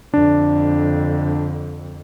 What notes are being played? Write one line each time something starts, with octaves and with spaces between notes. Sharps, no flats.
F2 D3 D4